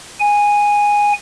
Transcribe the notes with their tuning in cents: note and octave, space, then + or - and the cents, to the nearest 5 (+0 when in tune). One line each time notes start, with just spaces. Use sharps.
G#5 -10